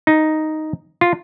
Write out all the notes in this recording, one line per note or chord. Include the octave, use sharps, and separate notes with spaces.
D#4
F4